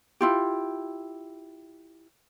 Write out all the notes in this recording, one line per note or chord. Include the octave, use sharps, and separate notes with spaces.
E4 F4 G4